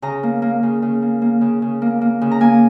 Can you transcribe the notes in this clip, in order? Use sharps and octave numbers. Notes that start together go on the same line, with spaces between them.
C#3 A#5
A#3
A#3
C#3
C#3
A#3
A#3
C#3
C#3
A#3
A#3
C#3
A#5
A#3 G#5